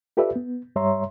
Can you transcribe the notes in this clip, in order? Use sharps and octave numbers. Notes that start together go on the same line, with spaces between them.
F4 G4 A4 B4 D5 E5
B3
G2 G3 C#5 E5 A#5 C6